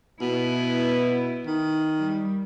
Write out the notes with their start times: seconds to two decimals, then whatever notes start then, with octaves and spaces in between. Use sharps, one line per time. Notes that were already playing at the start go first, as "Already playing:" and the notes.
0.21 B2 B3 E4
1.46 D#3
1.98 G3